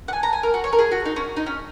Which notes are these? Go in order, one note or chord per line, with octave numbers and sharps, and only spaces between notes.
F#5
G#5
A#5
G#5
A#4
F#4
C#5
A#4
G#4
F#4
D#4
C#4
D#4
C#4